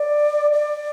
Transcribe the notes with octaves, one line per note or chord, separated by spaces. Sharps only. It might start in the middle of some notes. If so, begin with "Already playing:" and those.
Already playing: D5
D5